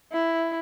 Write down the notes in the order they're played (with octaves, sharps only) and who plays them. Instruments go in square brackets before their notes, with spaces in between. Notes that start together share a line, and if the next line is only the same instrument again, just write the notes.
[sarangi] E4